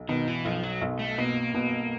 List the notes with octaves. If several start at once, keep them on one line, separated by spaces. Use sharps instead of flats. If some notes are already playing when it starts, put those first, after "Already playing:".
Already playing: B1
B2 D#3
E3
B1 F3
F#3
B1
A3
B2 A#3
B2